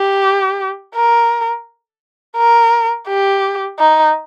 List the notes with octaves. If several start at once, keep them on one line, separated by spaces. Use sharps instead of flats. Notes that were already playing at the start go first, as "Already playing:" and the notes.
Already playing: G4
A#4
A#4
G4
D#4